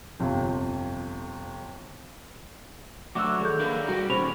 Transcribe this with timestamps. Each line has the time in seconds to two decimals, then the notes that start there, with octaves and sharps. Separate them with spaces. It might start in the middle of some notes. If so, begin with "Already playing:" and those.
0.20 G1 F2 C3
3.15 D2 F#3 A3 D4 F#4 E5 D6 E6
3.41 D#3 G#4 A4 G6
3.59 A#3 D4 A#4 B4
3.89 G3 F#4 G4
4.10 A#2 D3 D#3 C#4 C5 D5 B5 F7